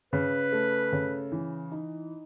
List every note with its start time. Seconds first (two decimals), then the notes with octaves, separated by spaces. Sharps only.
0.13 C#3 B4
0.52 A3
0.93 C#3
1.32 E3
1.72 D#4